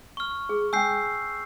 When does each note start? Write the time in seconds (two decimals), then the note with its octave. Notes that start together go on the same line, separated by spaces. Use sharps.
0.17 C#6 F6
0.49 G#4
0.73 G5 G#5 E6 G6 C7